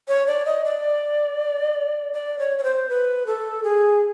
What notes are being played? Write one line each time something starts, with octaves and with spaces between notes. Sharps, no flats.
C#5
D5
D#5
D5
D5
C#5
C#5
C5
B4
A4
G#4